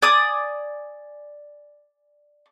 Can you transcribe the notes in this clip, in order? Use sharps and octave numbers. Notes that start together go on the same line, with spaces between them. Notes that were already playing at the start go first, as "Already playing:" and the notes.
D5 G#5 D#6